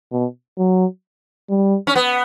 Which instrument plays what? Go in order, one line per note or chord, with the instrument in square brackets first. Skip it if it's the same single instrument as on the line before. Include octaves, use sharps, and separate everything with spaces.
[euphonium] B2
F#3
G3
[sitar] C#4
B3